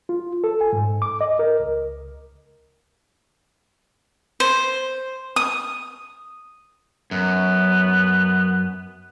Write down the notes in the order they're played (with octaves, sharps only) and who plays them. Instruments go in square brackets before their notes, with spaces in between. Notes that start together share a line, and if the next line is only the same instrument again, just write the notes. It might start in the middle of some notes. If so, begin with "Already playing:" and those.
[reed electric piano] F4
A4
G#5
G#2
D6
D#5
A#4
C#2
[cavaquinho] C5
D#6
[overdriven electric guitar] F#2 [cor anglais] B3